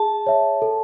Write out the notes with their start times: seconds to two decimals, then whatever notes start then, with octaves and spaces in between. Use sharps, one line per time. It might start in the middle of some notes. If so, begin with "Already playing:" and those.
Already playing: G#4 A5
0.27 C#5 E5
0.62 A4